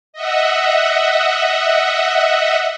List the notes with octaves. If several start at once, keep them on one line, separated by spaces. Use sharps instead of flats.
D#5 E5 F#5